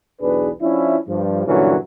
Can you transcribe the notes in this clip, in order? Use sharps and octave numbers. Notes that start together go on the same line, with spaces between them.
B1 E2 D4 G#4 B4
F3 C#4 D4 E4
G2 F3
G2 A#2 D3 E3 F#3 C#4